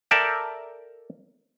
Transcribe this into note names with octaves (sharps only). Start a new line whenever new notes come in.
A4 A#4 D5 E5 G5 A5